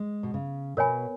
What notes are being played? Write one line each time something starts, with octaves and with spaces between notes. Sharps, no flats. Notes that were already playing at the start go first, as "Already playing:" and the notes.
Already playing: G#3
B2
C#3
B2 A#4 C#5 G#5 B5